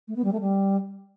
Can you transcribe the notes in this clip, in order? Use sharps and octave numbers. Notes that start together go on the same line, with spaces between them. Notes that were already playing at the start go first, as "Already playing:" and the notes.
A3
B3
G3
A3
G3